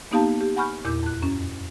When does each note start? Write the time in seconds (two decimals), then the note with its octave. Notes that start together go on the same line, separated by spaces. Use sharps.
0.11 A#3 B3 D#4 G4 F5 A5
0.41 G4
0.56 F#5 G#5 B5 C#6 F6 G6
0.85 E2 A#2 E4 D6 G6
1.03 F2 F#6
1.22 F#2 C#4